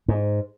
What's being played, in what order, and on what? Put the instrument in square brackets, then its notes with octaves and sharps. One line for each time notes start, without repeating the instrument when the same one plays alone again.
[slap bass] G#2